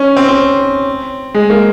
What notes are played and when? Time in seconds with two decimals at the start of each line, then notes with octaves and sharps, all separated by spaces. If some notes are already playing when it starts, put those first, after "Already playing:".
Already playing: C#4
0.16 C4
0.28 C4
1.34 G#3
1.50 A#3